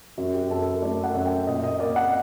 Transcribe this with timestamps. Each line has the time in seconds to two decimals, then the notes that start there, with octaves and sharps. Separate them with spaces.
0.17 F#2 F#4
0.34 G4
0.50 F#2 A4
0.66 A#4
0.82 A3 D5
1.04 F#5
1.15 F#2
1.26 G5
1.47 A#2 D#5
1.64 D#5
1.79 A#3 D5
1.96 F#5